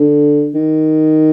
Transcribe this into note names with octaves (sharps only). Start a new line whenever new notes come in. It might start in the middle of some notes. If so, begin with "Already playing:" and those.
Already playing: D3
D#3